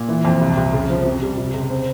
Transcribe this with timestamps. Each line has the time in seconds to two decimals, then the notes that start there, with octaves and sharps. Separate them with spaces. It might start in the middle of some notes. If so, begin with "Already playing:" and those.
Already playing: A#2
0.09 E3
0.25 F2
0.41 C2
0.57 C2
0.73 C#3
0.90 F3
1.05 C3
1.22 G3
1.37 C3
1.54 C#2
1.70 C4